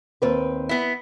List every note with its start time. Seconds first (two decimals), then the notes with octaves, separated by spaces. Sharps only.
0.22 D#2 C4 B4
0.69 B3 E4